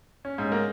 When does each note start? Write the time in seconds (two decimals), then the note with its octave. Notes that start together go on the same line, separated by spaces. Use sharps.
0.25 C#4
0.38 G#2
0.52 A#3